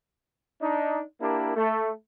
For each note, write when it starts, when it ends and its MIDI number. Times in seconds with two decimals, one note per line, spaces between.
0.61 1.01 62
0.61 1.01 63
1.20 1.54 58
1.20 1.54 62
1.20 1.54 64
1.20 1.54 67
1.20 1.54 70
1.56 1.90 57